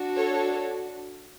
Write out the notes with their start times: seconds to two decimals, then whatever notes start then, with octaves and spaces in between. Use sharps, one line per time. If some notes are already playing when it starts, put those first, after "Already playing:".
Already playing: D4 F#4
0.17 A4 C#5